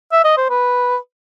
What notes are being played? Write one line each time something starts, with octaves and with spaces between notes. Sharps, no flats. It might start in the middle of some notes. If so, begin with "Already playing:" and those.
E5
D#5
C5
B4